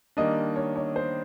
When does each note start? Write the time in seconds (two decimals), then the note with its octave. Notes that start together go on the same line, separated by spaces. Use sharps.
0.17 D#3 G3 A#3 D4 D#5
0.56 C#5
0.76 C#5
0.96 C5